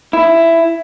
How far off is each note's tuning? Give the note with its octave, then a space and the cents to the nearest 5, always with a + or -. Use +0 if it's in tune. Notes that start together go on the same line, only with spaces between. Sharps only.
E4 +10